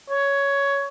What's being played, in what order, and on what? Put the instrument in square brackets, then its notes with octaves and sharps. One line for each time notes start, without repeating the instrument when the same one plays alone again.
[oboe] C#5